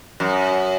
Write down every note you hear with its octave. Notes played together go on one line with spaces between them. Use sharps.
F#2